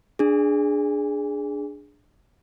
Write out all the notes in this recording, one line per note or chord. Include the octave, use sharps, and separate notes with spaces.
D4 G#4